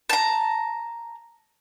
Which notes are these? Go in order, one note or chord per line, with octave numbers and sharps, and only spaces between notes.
A5 A#5